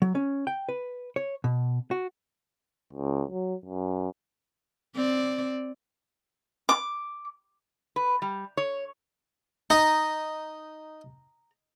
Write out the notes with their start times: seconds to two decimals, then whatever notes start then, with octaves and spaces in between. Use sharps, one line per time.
0.02 F#3
0.15 C#4
0.47 G5
0.69 B4
1.16 C#5
1.44 B2
1.91 F#4
2.93 C#2
3.30 F#3
3.66 F#2
4.96 C4 D5
6.69 D6
7.96 B4
8.22 G3
8.57 C#5
9.70 D#4 A#5